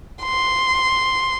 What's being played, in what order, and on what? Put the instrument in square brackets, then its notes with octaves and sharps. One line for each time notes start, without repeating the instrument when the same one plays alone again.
[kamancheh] C6